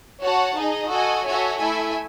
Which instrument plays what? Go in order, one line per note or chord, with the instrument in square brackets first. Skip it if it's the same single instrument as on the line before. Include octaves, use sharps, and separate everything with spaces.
[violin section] F#4 C#5 F#5 A5
D#4 G#4 D#5
F#4 A4 D#5 G#5
F#4 A4 C#5 E5 G#5
A3 E4 A4 E5 G#5